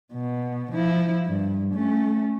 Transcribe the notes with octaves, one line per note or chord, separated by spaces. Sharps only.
B2
F3 E4
G2
A3 C#4